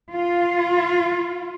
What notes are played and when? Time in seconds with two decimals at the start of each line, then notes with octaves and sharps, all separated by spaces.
0.12 F4